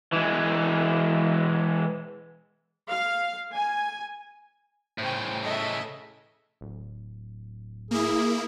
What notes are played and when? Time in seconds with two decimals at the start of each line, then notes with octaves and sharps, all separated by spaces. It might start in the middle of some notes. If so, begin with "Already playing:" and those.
0.13 E3 G#3
2.89 F5
3.53 G#5
4.98 A2 C#3 C5 G5
5.42 A4 D#5 E5
6.61 D1
7.91 A#3 E4 G#4